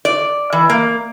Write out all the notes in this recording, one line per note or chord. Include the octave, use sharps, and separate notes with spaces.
D5
E3
A#3